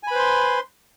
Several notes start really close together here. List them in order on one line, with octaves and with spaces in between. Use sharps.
G#5 B5 B4 C5 C6